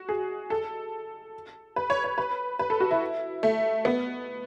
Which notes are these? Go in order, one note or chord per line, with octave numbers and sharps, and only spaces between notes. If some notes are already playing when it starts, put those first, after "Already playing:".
Already playing: F#4
G#4
A4
B4
C#5
C#5
B4
B4
A4
F#4
E4
A3
B3